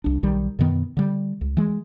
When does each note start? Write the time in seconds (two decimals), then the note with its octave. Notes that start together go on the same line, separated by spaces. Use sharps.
0.04 C2 D4
0.23 B1 D#3 G3
0.59 F#2 B2 D#3 B3
0.97 D3 G3
1.41 C#2
1.57 E3 G#3